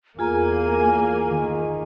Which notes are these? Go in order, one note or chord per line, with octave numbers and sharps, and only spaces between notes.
E2 A#3 F4 G#4 G#5 A#5
D#3